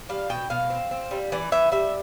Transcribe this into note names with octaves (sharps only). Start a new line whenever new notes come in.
G3 F5
B2 G5
B2 F5
C4
C4
G3
E3 D5
E3 E5
G3 E5